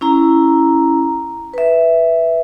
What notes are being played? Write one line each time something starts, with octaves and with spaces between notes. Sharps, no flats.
C#4 E4 A#5
B4 E5